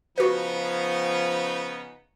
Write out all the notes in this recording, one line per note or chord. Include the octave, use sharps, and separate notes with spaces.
C#3 F3 B3 D#4 F#4 B4